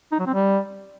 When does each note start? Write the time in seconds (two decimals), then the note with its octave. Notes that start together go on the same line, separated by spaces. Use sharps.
0.12 D#4
0.19 F#3
0.26 C4
0.34 G3